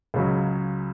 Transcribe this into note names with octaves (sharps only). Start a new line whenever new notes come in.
C#2 C#3 F#3